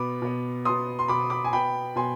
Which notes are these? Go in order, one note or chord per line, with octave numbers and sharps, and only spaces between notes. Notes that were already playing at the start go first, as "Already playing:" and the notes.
Already playing: B2 B3 B5 D6
B2 B3
B2 B3 C6 D#6
C6
B2 B3 B5 D6
B5 D6
G#5
B2 B3 G5 B5
B2 B3 G#5 C6